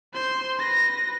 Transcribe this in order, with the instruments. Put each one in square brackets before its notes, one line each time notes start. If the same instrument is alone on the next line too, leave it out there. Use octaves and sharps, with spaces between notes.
[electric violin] C5 C6
B4 A#6